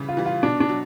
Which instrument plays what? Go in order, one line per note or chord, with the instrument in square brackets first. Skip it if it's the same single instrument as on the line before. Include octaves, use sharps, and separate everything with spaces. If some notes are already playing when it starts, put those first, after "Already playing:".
Already playing: [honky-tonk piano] C#3 E3 G3
[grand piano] F4
[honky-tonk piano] E3 G3
[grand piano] F4
[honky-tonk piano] B2 [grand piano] D4
[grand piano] D4
[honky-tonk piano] F#3